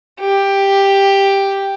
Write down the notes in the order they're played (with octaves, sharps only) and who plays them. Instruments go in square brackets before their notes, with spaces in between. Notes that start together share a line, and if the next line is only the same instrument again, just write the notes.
[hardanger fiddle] G4